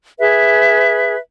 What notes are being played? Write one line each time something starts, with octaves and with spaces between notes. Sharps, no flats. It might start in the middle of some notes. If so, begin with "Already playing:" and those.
G#4 B4 E5